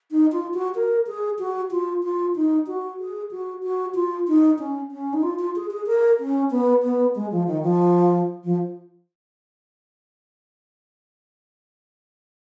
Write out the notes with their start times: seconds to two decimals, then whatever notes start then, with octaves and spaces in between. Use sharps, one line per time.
0.11 D#4
0.32 F4
0.54 F#4
0.75 A#4
1.07 G#4
1.39 F#4
1.71 F4
2.04 F4
2.36 D#4
2.67 F#4
3.00 G#4
3.31 F#4
3.63 F#4
3.95 F4
4.28 D#4
4.59 C#4
4.91 C#4
5.13 D#4
5.23 F4
5.39 F4
5.56 G#4
5.71 G#4
5.87 A#4
6.20 C#4
6.51 B3
6.83 B3
7.15 G#3
7.31 F3
7.47 D#3
7.63 F3
8.44 F3